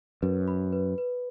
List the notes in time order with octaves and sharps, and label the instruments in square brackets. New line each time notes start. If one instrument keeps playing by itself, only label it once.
[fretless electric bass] F#2 [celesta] B4
[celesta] B5
B4
B4